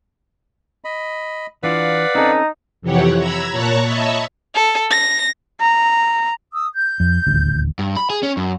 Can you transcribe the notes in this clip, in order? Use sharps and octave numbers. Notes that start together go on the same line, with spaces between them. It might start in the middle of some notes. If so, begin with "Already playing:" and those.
D#5 B5
E3 D4 F4 B4 D5 F5 F#5
C4 C#4 D#4 A4
F2 C3 E3 G4 C#5 F#5
A#5 B5 E6 G#6
A#2 C#5 A5 A#5 C#6 F#6
C#5 D#5 E5 A5 B5 C#6
A4
A#6
A#5
D#6 E6
G6
F2
D#1 A1 D2
G2
B5
G#4
C#4
F#2